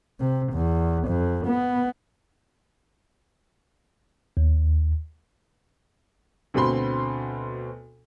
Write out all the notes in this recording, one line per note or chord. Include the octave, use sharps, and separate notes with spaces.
C3
E2
F2
B3
D#2
D2 B2 C4 B5 C6